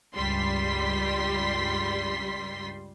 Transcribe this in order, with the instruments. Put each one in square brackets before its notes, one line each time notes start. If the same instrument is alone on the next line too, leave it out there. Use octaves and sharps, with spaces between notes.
[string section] C#2 G2 G3 C6 B6